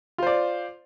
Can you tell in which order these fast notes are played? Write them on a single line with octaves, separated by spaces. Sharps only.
F4 C5 D5